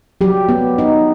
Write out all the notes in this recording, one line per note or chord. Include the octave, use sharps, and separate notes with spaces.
F#3 G4
B3
D#4